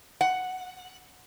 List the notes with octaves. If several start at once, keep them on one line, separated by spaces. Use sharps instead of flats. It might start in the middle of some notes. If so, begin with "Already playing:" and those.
F#5